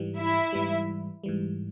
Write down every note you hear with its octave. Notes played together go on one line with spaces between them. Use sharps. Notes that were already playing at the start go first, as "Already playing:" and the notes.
Already playing: G#2 E3 G3
E4 E5
G#2 E3 G3
G#2 E3 G3